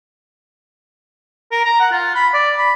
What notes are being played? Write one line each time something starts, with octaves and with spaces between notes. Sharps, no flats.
A#4
A#5
F#5
F4
B5
D5
B5